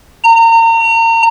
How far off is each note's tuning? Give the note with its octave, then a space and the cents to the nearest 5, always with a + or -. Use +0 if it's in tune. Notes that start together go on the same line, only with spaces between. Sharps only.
A#5 -35